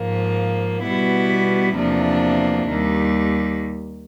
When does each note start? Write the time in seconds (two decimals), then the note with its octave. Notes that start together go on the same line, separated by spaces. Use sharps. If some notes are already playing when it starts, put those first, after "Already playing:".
Already playing: G#2 F3 A#3
0.83 B2 G3 B3 E4
1.74 E2 C3 F3 A#3 D4
2.67 D#2 D#3 G3